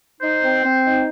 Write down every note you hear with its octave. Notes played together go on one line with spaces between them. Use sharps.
D#4 C5
C4
C4
D#4